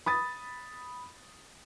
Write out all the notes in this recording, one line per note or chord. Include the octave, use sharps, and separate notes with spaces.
B5 D#6 A6